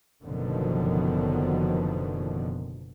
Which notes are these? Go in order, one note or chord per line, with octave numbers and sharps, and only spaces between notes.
F#1 F#2 B2 D3 D#3 F3